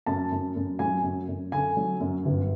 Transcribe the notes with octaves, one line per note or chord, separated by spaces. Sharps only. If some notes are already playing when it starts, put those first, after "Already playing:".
F#2 A5
F#2
F#2
F#3 G#5
F#2
F#2
D3 G#5
F#3
F#2
G1